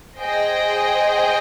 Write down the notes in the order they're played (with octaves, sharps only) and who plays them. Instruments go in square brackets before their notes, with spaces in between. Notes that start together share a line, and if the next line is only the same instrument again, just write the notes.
[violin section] G#4 C5 D#5 G5